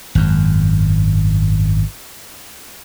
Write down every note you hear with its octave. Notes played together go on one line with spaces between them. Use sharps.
G#1 F#2